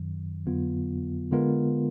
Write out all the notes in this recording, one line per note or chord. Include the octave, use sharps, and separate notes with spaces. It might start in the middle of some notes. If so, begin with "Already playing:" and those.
Already playing: F#2 D#3 F#3
F2 D3 F#3 B3 F4
D3 G#3 B3 F4 A#4